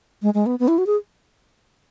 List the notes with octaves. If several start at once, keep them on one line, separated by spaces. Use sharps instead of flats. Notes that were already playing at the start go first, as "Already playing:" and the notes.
G#3
G#3
B3
B3
E4
F#4
G#4